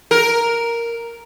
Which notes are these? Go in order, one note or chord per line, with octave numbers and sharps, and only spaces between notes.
A#4